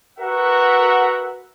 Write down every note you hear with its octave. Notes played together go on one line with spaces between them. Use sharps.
F#4 A#4 B4 E5 F#5